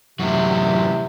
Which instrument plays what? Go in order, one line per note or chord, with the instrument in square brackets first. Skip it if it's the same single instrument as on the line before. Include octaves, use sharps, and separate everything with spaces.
[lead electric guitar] F#2 A2 [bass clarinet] C3 [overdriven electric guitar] E3 F#4